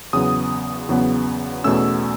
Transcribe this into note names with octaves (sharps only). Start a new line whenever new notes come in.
E2 C#3 F#3 B3 D#6
E2 C#3 F#3 B3
E2 B2 A3 C#4 E6